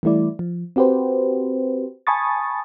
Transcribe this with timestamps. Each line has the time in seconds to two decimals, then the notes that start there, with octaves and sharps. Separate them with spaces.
0.03 E3 G3 A3 E4 D5
0.39 F3
0.76 C4 F#4 G4 B4 C5
2.07 G#5 A5 B5 C#6 D#6 A6